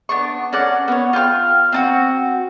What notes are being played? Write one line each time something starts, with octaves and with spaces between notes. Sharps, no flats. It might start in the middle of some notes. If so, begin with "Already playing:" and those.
B3 D4 C#6
C#4 A#4 D5 F#5
B3 C#5
F4 G5 C#6 F6
C4 D4 F#4